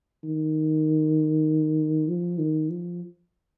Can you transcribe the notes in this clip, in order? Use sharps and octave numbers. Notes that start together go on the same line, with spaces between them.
D#3
F3
D#3
F3